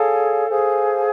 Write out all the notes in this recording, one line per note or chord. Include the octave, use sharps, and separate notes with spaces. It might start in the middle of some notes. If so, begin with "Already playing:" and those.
Already playing: G#4 A4 C#5 F5 G#5
G#4 C5 F5 G#5